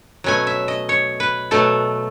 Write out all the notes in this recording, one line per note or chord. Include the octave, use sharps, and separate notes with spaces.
B2 F#3 A3 C#4 G#5
E5
D#5
C#5
B4
B2 F#3 A3 A4